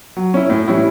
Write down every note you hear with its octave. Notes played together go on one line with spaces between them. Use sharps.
F#3
C#4 E4
A2
E3 G3 C#4 E4